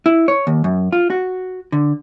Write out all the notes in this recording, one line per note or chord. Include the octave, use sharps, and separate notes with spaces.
E4
C#5
D#2
F#2
F4
F#4
D3